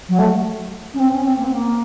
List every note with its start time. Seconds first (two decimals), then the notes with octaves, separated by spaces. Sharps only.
0.09 F#3
0.19 A3
0.94 C#4
1.00 C4
1.12 C#4
1.24 C4
1.37 A#3
1.44 C4
1.52 A#3